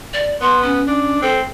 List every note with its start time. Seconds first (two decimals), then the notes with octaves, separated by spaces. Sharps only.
0.13 D5
0.41 B3 C6
0.62 C#4
0.87 D4
1.22 C4 A4